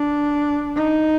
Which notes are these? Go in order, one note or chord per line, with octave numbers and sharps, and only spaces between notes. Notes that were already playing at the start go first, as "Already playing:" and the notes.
Already playing: D4
D#4